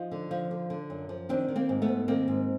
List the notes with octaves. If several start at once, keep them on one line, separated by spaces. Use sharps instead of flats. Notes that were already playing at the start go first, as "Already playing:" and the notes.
Already playing: F3 D#4 F4
D3
F3
D3
D3
F#2
F3
D#3 C4 D4
D#3
A#3 C4
G#2
A3 B3
G#2
D#3 A#3 C4
G#2